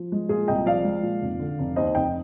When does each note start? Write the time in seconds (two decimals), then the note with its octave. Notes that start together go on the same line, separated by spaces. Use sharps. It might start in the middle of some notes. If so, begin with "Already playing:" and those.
Already playing: F3
0.12 G#3
0.29 A#2 F4 G#4
0.48 C2 D#5 G5
0.66 F3 D5 F5
0.84 G#3
1.03 A#2
1.22 F1
1.40 D3
1.59 F1
1.76 D#2 C5 D#5
1.95 F1 D#5 G5